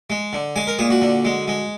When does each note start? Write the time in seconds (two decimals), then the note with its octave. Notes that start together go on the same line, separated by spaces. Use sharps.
0.10 G#3
0.33 D3
0.56 G#3 G#5
0.67 A#4
0.79 A#2 G#4
0.90 F#4
1.02 D3
1.25 G#3
1.48 G#3